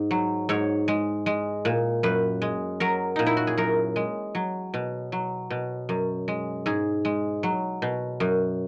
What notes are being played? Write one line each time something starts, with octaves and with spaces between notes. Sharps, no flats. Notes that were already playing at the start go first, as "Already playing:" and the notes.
Already playing: G#2
F#3
G#2 C#5
G#3
G#3
A#2
F#2 B4
G#3
F#3 A#4
A#2 D#4
E4
F#4
G#4
F#2 A#4
G#3
F#3
B2
F#3
B2
F#2
G#3
G#2 G#4
G#3
F#3
B2
F#2